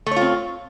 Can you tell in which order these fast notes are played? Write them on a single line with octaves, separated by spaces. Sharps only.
A3 C#5 F4 C4